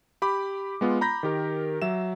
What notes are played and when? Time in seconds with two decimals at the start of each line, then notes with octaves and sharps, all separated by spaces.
0.22 G4 B5 D6
0.81 G#3 B3 F4
1.01 A#5 B5 G6 A#6 B6
1.23 D#3 G4 A#4
1.82 F#3 E5 E7